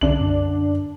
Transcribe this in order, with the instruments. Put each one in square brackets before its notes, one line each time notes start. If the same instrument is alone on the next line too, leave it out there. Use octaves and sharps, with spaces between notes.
[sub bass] C2 [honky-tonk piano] D3 D4 F#7
[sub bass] F#2